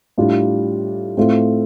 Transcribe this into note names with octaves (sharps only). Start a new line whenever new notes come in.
A2 G3 D4 F4
A2 A3 C4 F4